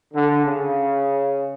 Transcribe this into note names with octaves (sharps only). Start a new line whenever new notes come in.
D3
C#3